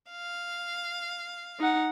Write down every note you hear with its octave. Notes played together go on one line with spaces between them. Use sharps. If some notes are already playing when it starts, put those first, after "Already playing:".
F5
D#4 F#5